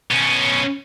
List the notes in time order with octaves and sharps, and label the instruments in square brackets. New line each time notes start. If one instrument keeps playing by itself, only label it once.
[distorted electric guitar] B2 C#4